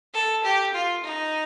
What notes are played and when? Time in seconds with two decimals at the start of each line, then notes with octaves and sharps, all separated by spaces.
0.14 A4
0.44 G4
0.74 F4
1.04 D#4